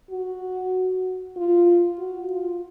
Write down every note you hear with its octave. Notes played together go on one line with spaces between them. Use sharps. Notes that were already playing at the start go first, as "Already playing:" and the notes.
F#4
F4
F#4
F4